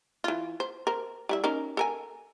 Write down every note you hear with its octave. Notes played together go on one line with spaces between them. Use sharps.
E3 F4
C5
A#4 C5
G3 E4 E5
C#4 D#4 A#4
A4 A#4 G#5